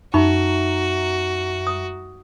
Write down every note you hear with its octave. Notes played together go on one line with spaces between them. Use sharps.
F#2 D#4 F#4 E5 A#5 B5 C#6
D#6